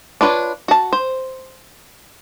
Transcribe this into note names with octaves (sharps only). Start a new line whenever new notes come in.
D4 F4 B4 C#5
F#4 A5
C5